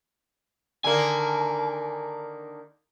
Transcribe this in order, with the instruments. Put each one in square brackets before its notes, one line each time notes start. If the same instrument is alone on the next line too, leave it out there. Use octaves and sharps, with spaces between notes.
[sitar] D3 D#3 A#3 [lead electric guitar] G#5